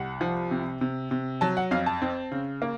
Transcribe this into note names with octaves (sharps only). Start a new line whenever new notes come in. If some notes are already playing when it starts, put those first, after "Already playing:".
Already playing: C2 F#5
F3
C3
C3
C3
F#3 A5
F#5
F2 F5
A5
C4
C#3
A#3